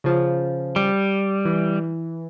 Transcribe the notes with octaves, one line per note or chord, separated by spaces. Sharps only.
C#3 F3
G3
E3